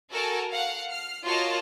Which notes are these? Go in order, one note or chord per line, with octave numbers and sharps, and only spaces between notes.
F#4 A4 A#4 G#5 A5
F5 F#5
F6 C7
F4 F#4 A#4 C#5 D#5 A5